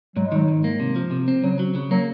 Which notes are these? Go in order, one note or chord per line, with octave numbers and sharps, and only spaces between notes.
G#2 F#3
G#3
D#3 F#3
G#2
A#3
C3
F3
C3
C4
C#3 F#3
F#3
C#3
F#3 A#3